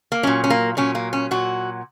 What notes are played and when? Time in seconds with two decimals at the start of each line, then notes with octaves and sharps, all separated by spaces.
0.12 A#3
0.23 A#2 F#3 C#4
0.44 C#4
0.50 A#3
0.77 A#2 F#3 C#4
0.95 A#3
1.13 C#4
1.31 A#2 F#3 F#4